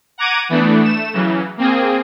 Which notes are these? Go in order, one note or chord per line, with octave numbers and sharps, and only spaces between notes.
F#5 A#5 D6 G#6 D#7
E3 A3 B3 D4
A3 E7
C#3 E3 F#3
A#3 C4 G#4